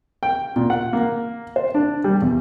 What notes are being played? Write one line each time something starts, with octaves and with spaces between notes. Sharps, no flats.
G5
A#2
F#5
A#3
C5
D4
G3
E2